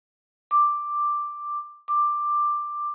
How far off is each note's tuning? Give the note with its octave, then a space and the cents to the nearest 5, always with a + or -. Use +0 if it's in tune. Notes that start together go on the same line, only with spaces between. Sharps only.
D6 +5
D6 +10